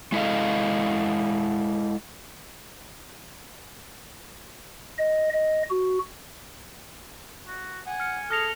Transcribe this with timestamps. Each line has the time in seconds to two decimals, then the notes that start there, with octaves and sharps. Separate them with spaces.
0.12 G#3 E4 A4 D#5 F5
4.98 D#5
5.33 D#5
5.71 F#4
7.47 F#4
7.87 F#5 G#5
8.00 F6 C#7
8.31 G#4 A4 F6 A#6 F7